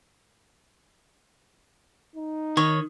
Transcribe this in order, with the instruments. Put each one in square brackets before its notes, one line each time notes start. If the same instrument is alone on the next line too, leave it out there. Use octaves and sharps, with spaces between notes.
[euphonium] D#4
[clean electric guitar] D#3 [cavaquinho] C#5